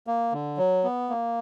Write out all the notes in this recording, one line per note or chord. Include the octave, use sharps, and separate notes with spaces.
A#3
D3
F#3
B3
A#3